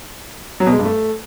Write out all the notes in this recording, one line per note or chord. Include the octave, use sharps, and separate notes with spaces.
F#3
B2
G#3
G2
A3